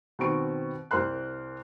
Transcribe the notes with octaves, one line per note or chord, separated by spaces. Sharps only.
B2 D#3 C4 C#6 D7
C2 A#4 C5 C6 F#6